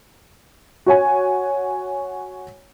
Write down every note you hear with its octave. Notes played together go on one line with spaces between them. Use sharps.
F#4 C#5 G#5